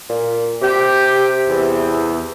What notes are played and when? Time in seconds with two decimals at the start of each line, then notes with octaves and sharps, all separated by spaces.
0.10 A#2
0.62 C3 G4
1.49 E2